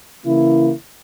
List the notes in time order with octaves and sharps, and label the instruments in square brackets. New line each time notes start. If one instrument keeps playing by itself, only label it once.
[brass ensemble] C#3 E3 A#3 E4